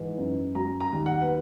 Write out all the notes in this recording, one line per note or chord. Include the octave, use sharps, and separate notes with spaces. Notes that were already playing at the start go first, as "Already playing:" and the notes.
Already playing: G#2 E3
F#2
F#3 A#5
A#5
D#2
F#5
B4